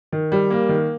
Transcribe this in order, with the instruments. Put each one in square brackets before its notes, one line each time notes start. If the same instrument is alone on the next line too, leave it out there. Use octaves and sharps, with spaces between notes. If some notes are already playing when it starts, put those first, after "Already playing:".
[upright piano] D#3
G3
A#3
D#3